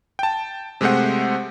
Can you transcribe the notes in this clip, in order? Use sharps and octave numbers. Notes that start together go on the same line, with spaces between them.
G5 A5
C3 G#3 A3 C5 F#5